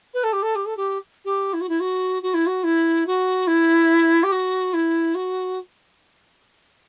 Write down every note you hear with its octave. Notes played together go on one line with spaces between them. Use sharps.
B4
A4
G4
A4
G4
A4
G4
G4
E4
F#4
E4
F#4
F#4
E4
F#4
E4
F#4
E4
G4
F#4
E4
F#4